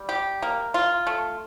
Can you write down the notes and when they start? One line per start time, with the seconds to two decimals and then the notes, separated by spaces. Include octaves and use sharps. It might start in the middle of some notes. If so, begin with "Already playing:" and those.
Already playing: G3
0.09 G4
0.42 A#3
0.74 F4
1.07 A3